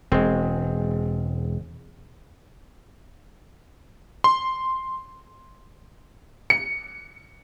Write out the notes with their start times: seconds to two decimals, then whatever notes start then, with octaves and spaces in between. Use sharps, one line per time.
0.12 E1 G#3 C4
4.24 C6
6.50 C#7